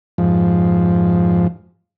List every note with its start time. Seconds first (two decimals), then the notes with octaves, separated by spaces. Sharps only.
0.18 F2 G#2 F3